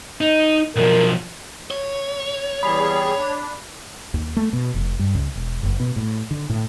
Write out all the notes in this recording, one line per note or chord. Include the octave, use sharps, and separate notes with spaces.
D#4
B1 F3 A#4
C#5
E2 G3 G#4 B5
D4
D#2
A3
B2
F1
G2
C#2
E1
F#1
B2
A2
D3
A2